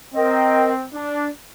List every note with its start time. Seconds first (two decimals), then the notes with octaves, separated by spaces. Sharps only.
0.15 C4 A#4 D#5 G5
0.94 D4